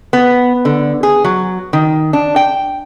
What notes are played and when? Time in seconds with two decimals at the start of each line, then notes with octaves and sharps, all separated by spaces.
0.13 B3
0.65 D3
1.03 G#4
1.24 F#3
1.73 D#3
2.13 D4
2.36 G5